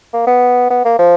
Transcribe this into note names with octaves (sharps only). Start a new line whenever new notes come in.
A#3
B3
B3
A#3
F3